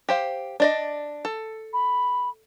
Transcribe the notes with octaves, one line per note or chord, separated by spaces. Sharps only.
G4 C5 F5
D4 D5 D#5
A4
B5